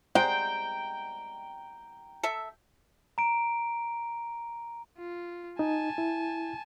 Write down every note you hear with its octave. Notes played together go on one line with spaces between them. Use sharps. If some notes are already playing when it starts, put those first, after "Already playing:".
G#3 C5 G5 A#5
A4 E5
A#5 D7
F4
D#4 G#5 A5
E4